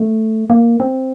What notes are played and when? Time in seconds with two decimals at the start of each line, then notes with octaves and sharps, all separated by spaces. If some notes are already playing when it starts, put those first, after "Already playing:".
Already playing: A3
0.50 A#3
0.80 C4